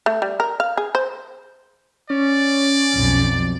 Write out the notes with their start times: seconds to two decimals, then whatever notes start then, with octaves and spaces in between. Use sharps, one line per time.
0.06 A3
0.22 G3
0.40 A#4
0.60 F5
0.77 G#4
0.95 C5
2.10 C#4 D5
2.94 B1 F2